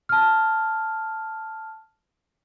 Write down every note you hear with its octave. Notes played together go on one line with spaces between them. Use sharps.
A5 F6